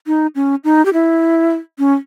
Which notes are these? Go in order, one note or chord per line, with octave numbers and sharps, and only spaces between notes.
D#4
C#4
D#4
G4
E4
C#4